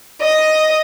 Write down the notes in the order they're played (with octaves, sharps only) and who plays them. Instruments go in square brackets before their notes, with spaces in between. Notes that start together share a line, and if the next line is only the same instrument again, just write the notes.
[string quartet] D#5